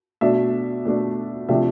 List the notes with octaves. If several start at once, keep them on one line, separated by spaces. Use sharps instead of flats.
B2 A3 D4 E5
B2 A3 D4
C3 F3 A3 D4 E5